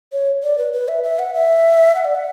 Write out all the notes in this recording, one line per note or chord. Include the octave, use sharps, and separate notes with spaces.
C#5
D5
B4
B4
E5
E5
F#5
E5
F#5
D5
F#5